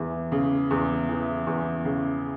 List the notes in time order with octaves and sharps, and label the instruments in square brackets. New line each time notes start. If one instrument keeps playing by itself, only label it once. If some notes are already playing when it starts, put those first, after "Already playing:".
Already playing: [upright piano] E2 E3
C#3
E2
E3
E2
C#3